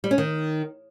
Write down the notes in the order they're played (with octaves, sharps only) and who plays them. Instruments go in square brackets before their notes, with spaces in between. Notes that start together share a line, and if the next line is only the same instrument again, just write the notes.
[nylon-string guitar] G3
C#4
D#3